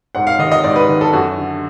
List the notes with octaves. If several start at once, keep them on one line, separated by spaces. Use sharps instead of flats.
G#2 F#5
F5
D#3 D#5
D#5
G#2 D5
B4
D#3
A4
F#2 F#4
D3